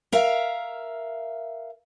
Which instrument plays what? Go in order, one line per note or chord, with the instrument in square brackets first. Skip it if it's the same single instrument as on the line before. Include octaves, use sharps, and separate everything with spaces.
[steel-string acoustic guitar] A#4 E5 F5